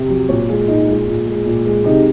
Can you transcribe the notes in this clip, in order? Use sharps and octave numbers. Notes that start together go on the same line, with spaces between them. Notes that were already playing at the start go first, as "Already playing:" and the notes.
Already playing: C3
F#3
A#2 C#5
G#3 F4
A#2 D#4
G#3 F4
A#2
G#3
A#2
G#3
C3 D#4